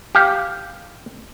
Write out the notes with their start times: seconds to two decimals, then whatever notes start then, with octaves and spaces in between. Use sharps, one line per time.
0.15 G4 F5